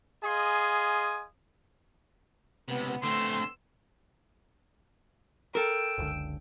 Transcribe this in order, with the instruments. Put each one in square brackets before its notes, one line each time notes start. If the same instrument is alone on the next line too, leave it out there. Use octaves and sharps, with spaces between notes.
[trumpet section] G#4 D#5 F5 G#5 C6 D#6
[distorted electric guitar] C#2 C3 [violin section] B3
[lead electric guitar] D2 A3 [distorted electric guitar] D3 C4 [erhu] C6 [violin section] E6
[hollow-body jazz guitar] A4 A#4 [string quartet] G5 E6
[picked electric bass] F#1 C#2 D3